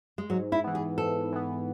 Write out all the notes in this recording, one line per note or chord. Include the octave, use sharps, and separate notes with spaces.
G#3
G#2 F#3
E4
E3 B3
G#4
G#2 A4
E3 B3